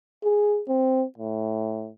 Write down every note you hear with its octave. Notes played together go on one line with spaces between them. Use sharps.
G#4
C4
A2